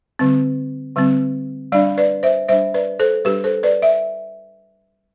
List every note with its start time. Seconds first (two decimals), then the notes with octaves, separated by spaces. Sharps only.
0.19 D3 G3 C4
0.96 D3 G3 C4
1.72 G3 D4 D5 F5
1.97 B4 D5
2.23 C5 E5
2.49 G3 D4 C5 E5
2.74 B4 D5
2.99 A4 C5
3.25 G3 D4 G4 B4
3.44 A4 C5
3.63 B4 D5
3.82 E5